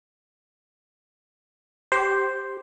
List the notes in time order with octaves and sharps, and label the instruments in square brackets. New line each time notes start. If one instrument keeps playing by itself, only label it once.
[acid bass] G4 [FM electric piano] C5